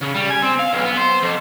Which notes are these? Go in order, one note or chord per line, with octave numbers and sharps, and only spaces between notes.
C#3
G3
G#5
C4
F5
B1
B3
C5
F2